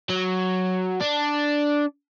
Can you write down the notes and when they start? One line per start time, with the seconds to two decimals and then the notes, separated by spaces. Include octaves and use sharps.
0.10 F#3
1.01 D4